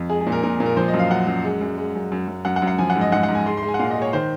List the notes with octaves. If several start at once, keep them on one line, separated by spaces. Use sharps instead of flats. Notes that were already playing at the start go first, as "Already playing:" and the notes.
Already playing: F2
G#3 G#4
G#4
A#2
A#4
A#2 A#4
A#2
A#4
F3 C5
D#5
F#2
F5
F#2 F#5
F#2
G#3
F#2
G#3
F#2
F#2
F#2
F#2 F#5
F#5
F#2
F#5
F3 G#5
F#5
G#2
D#5
G#2 F#5
F#5
G#2
G#5
G#3 C6
C6
G#3
G#5
F#5
A#2 F5
D#5
G#3
C#5
D#3 C5